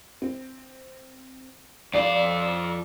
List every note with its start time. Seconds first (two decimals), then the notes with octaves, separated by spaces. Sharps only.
0.22 C4
1.94 F2 D5 F5